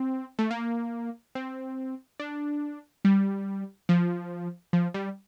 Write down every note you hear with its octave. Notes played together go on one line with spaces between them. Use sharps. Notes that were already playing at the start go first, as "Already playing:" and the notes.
Already playing: C4
A3
A#3
C4
D4
G3
F3
F3
G3